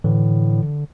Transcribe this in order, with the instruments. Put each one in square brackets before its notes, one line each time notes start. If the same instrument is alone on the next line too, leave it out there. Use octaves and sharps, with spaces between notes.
[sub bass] A2 [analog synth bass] D3 [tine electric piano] E3